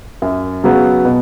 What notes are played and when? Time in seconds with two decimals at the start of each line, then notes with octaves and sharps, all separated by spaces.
0.22 F#2
0.64 C#3 F#3 B3
1.05 B2